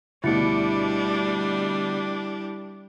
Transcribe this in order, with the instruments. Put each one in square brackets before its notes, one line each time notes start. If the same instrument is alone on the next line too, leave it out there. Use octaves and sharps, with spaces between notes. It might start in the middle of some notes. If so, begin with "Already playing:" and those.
[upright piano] D2 B2 [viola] G3 D4 [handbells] E4 C#7